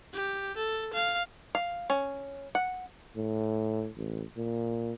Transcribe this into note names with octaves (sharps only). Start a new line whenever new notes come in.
G4
A4
F5
F5
C#4
F#5
A2
A1
A#2